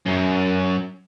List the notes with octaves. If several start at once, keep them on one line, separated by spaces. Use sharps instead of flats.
F#2